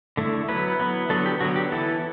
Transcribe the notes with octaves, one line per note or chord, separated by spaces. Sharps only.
D3 A3 E4
F#3 B3 E4 B4
F#3 B3 E4
D3 F#3 B3 A4
G4
D3 F#3 B3 F#4
G4
E3 B3 E4 A4